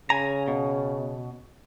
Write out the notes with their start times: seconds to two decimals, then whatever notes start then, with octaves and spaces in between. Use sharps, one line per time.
0.10 C#3 G#5 A#5
0.48 B2